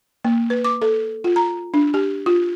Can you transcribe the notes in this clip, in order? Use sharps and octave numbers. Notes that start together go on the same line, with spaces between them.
A#3
B4
D6
A4
F4
A#5
D4
G4
F4